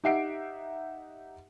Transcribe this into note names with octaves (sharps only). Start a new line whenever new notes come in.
D#4 G4 E5 F#5 C7 D7